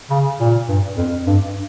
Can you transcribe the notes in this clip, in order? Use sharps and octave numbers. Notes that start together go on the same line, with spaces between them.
C#3
A#2
G2
F2
G2